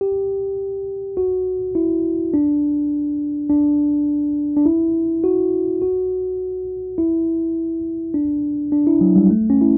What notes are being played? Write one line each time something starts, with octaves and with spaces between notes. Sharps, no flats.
G4
F#4
E4
D4
D4
D4
E4
F#4
F#4
E4
D4
D4
E4
F#3
G3
A3
C#4
E4